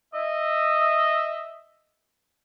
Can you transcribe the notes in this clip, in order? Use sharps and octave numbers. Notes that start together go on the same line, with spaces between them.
D#5 E5